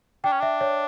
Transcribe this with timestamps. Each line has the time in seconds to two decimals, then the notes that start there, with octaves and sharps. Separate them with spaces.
0.24 D4 G5
0.32 C#4
0.40 D4 E5
0.61 C#5